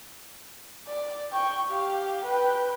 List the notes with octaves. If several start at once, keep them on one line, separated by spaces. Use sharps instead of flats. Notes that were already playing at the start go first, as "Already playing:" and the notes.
D5
G5 C#6
G4 F5
B4 G5